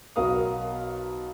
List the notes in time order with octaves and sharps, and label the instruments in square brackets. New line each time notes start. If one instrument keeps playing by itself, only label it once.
[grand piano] B1 B3 F#4 A#4 F5 D#6